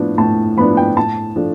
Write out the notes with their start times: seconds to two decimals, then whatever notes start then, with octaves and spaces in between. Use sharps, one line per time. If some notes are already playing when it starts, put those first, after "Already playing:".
Already playing: A2 F3 B3 D4
0.18 A2 A5
0.57 F3 B3 D4 B5
0.77 G5
0.97 A2 A5
1.36 F3 A3 D4